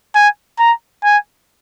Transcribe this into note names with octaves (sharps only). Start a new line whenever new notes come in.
G#5
A#5
G#5